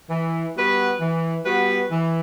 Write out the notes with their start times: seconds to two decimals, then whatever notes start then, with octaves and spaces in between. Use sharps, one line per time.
0.09 E3
0.55 G3 B3 F#4 B4
1.00 E3
1.44 G3 B3 F#4 B4
1.90 E3